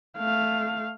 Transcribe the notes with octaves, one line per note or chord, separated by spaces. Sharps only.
A3 F5